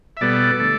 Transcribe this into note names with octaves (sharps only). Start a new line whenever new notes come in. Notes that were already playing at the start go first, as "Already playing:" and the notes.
E5
B2 G3 B3 A4 D5
D3 A3